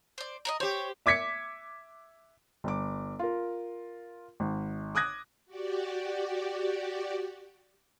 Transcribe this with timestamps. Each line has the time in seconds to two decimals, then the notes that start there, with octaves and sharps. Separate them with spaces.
0.18 C5 D5
0.45 A#4 C#5 D#5
0.60 G4 C5 C#5
1.06 E5 D6 G#6 B6 C#7
2.64 G1 D6
3.19 F4 A#4
4.40 G#1
4.95 D6 D#6 F#6 G#6 A#6
5.46 F#4 G4 D5